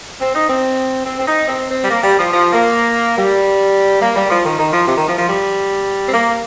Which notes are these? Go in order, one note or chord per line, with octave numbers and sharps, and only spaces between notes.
C4
D#4
C4
C4
C4
D#4
C4
C4
G3
A#3
G3
F3
F3
A#3
G3
A#3
G3
F3
D#3
D#3
F3
C3
D#3
F3
F3
G3
C4
A#3